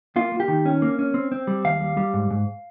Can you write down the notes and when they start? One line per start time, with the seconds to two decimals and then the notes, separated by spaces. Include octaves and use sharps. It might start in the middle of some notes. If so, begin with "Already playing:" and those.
0.16 A#3 F4
0.32 A#3
0.40 G4
0.48 D#3
0.65 C#4
0.82 A#3
0.99 C#4
1.14 C4
1.32 C4
1.47 G3
1.64 D#2 F5
1.80 G3
1.97 G3
2.14 G#2
2.30 G#2